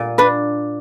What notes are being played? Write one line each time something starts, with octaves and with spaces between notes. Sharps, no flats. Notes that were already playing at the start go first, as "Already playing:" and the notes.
Already playing: A#2 G3
D4 B4